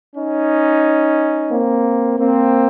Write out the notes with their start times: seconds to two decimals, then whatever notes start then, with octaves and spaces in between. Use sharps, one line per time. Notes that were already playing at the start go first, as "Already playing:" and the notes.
0.15 C#4 D#4
1.51 A#3 C4
2.19 A#3 C4